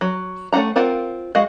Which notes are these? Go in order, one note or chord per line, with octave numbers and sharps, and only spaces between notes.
F#3
A3 C#4 D#4 F#5 A#5
C4 F4 A#4 F#5
G#3 F#4 D#5 F5 F#5